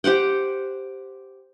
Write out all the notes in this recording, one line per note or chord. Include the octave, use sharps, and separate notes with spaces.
G4 C5 F#5 G5